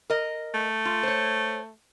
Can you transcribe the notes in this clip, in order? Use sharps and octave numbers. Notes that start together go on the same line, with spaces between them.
A#4 D#5
A3
F4
C5 C#5